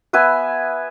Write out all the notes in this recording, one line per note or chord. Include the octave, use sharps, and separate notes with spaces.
B3 B4 E5 G#5